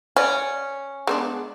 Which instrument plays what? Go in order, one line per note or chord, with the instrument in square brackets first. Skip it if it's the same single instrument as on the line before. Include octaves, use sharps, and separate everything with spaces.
[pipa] C#4 [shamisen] D5 G#5
[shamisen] G#3 B3 D4